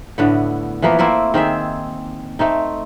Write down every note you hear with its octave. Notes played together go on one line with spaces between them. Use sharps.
A2 D3 B3
E3 F3 A#3 B3
A3 A#3 C4 E4
D#3 C4 G#4 E5
A3 C4 D#4